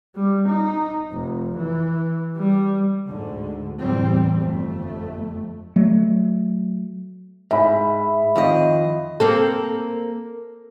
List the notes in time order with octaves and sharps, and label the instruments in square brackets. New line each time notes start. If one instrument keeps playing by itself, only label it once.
[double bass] G3
D#4
F1
E3
G3
[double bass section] D2 G#2 D3
E2 A2 E3 G3 C4
G1 F2 A3
[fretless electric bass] F#3 A3
[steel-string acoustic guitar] G#2 [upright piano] E5 B5
[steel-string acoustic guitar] F2 D#3 D#5
[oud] A#3 C4 A4